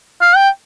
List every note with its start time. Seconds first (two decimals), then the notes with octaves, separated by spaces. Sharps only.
0.21 F5
0.36 G5